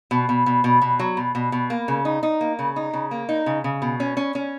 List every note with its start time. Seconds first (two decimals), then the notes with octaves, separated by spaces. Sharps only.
0.11 B2
0.29 B2
0.46 B2
0.64 B2
0.82 B2
0.99 F#3
1.17 B2
1.35 B2
1.52 B2
1.70 A#3
1.88 C#3
2.05 D#4
2.23 D#4
2.41 A#3
2.59 C#3
2.76 D#4
2.93 C#3
3.11 A#3
3.29 D#4
3.46 C#3
3.64 C#3
3.82 B2
4.00 C#4
4.17 C#4
4.35 C#4